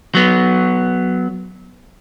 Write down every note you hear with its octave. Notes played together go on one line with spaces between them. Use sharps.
F#3 B3